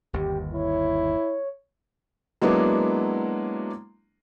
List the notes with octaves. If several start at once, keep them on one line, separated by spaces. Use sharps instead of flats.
G1 D#2 G4
E4 C#5
F#3 G#3 A#3 B3 D4 E4